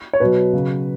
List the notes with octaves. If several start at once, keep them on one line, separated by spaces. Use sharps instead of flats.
C#5
B2 F#3 B4
C#3 F#3